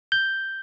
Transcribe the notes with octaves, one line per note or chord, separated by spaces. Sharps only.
G6